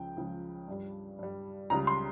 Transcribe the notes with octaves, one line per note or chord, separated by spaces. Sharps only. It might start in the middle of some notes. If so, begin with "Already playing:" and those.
Already playing: C#2 C#3 F3 G5
C#2 C#3 F3
G2 G3
G2 G3
C#2 C#3 G3 A#5
C6